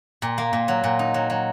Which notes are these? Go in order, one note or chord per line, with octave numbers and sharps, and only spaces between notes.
A#2
A#3
A#2
F#3
A#2
D#4
F#3
F#3